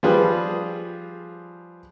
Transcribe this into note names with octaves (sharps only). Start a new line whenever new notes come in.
F3 G3 F4 G#4 B4